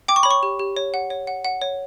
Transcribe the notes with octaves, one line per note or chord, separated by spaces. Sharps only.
G5 D6
C#6
C#5 B5
C#6
G4
G4
C#5
F#5
C#5
F#5
F#5
C#5